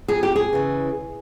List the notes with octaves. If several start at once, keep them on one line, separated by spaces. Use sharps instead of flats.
F2 G#4
G4
G#4
C#3 E3